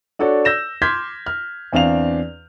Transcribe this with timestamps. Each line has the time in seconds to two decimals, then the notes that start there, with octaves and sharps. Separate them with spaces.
0.19 D4 F#4 A4 C#5 D5
0.45 E6 G6 A#6 E7
0.82 C6 D6 F6 G6 G#6 B6
1.26 F6
1.73 E2 C4 D4 F5 F7